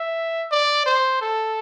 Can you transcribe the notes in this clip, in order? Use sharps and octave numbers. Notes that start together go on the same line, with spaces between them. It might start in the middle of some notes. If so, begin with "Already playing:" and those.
Already playing: E5
D5
C5
A4